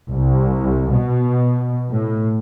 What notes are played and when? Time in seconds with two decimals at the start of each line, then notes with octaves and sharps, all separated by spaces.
0.12 C2
0.92 B2
1.90 A2